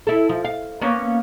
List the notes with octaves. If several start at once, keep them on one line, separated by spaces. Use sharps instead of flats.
E4 A4
F3
F5
A#3 B3 C#4